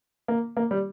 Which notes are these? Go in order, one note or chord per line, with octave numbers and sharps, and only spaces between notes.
A#3
A#3
G3